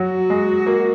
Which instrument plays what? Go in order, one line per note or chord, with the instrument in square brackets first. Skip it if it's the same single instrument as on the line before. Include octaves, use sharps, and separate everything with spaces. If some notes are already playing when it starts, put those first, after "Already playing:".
Already playing: [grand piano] F#3 [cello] F#4
[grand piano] G#3
A#3